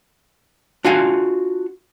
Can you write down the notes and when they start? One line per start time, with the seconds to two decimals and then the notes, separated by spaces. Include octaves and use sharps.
0.84 D4 F4 F#4 F5 G#5